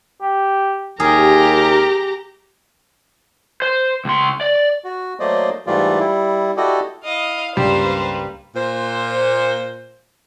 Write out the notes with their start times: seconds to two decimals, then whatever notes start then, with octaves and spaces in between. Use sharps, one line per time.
0.22 G4
1.00 D#2 G4 G#4 A#4 A#5
3.62 C5
4.05 C#2 C6
4.41 D5
4.84 F#4
5.20 F#3 A3 A#3 C5 D5 D#5
5.67 G#2 E3 G3 A3 F4 D5
6.00 G3 E4
6.57 E4 F#4 G4 A4 D5 D#5
7.04 E4 D#5 F5
7.57 C#2 G2 G3 A#3 B4 C5
8.55 A#2 C5